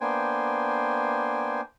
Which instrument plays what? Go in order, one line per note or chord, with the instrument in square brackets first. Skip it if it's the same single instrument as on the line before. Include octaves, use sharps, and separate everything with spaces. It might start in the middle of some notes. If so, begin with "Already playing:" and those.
[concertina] A#3 B3 D4 C5 G5 G#5